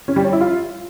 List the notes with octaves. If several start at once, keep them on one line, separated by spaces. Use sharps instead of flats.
C#4
G3
C#5
E4
F4